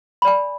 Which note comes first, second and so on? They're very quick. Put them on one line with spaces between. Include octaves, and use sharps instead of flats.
B5 D5 G#5